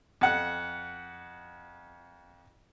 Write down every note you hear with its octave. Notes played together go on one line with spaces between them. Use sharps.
F2 F#5 F#6